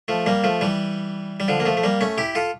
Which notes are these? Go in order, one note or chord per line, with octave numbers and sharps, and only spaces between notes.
F3 A3
G3 A#3
F3 A3
E3 G3
G3
D3 F3
A#3
F3 A3
A3
G3 A#3
A3 C#4
E4 G4
F4 A4